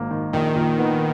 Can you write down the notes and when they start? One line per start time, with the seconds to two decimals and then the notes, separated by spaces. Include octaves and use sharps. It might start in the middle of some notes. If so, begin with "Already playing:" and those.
Already playing: G#1 D#3 A#3
0.11 D#3
0.33 A#1 D#3
0.55 A#2
0.78 B3